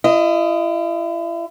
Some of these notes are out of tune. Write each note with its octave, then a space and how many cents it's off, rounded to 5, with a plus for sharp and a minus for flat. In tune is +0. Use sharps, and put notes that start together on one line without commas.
E4 +40 D#5 +0